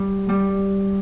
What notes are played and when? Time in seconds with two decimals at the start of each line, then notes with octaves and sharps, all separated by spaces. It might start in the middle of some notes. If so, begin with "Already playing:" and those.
Already playing: G3
0.29 G3